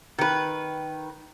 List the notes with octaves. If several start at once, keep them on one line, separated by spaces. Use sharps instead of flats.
D#3 B4